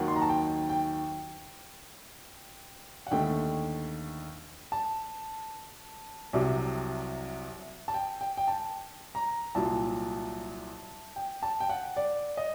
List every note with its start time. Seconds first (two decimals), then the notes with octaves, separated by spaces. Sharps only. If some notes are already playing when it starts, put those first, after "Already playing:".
Already playing: D#2 D#3 F#3 F#5
0.08 C6
0.15 A#5
0.22 A5
0.29 G5
0.69 G5
3.07 F#5
3.11 D#2 D3 A3 G5
4.72 A5
6.33 C2 C3 F#3
7.88 A5
7.94 G5
8.21 G5
8.37 G5
8.48 A5
9.15 A#5
9.55 C2 A#2 F#3 A5
11.16 G5
11.43 A5
11.60 G5
11.70 F#5
11.96 D5
12.37 D#5